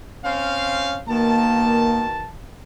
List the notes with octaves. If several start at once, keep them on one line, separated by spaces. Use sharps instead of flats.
C4 C#4 F5
B2 D#3 A#3 A5